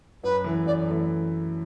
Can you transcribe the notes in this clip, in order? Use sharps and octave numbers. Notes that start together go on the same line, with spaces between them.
F#2 B4
E3 A3 E4 A4
F#2 D5
E3 A3 E4 A4